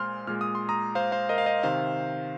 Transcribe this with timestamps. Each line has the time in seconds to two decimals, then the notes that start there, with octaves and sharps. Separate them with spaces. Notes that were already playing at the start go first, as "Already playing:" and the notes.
Already playing: A#2 G#3 C5 C6 F6
0.27 A#2 G#3 F6
0.41 D#6
0.55 C6
0.69 A#5 D#6
0.95 C5 F5
1.12 C5 F5
1.29 A#4 D#5
1.38 F5
1.46 A#4 D#5
1.63 C3 D#3 C5 F5